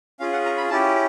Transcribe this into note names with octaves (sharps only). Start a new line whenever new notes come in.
C#4 F4 G#4 F5
F#5
A#5
B5
C#4 E4 G4 A5